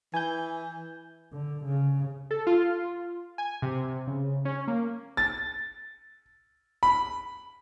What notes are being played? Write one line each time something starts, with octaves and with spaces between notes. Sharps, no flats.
E3 G#5 G6
D3
C#3
A4
F4
G#5
C3
C#3
C#4
A#3
A6
B5